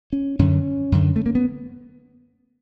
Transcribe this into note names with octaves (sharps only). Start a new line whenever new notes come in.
C#4
F#2 D3 C#4
F#2 D3
A3
A#3
B3